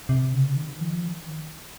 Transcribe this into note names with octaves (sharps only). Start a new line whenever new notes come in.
C3
C#3
D#3
F3
D#3